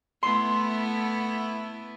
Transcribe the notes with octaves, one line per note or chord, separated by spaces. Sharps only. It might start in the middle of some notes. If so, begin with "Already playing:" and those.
A3 B3 E4 C6